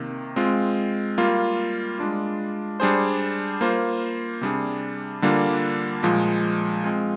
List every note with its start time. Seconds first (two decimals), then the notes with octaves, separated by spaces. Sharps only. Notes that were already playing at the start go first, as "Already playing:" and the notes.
Already playing: C3 D#3 A#3
0.36 G#3 C4 F4
1.18 G3 A#3 F4
1.99 G#3 D4 F4
2.80 G3 D4 G#4 C5
3.61 A#3 F4 C5
4.41 C3 G3 D4 G#4
5.22 D3 G3 A#3 D4 F4
6.03 A#2 F3 G#3
6.84 G#3 C4 F4